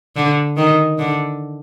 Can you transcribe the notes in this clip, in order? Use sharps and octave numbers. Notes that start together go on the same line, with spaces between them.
D3
D#3
D3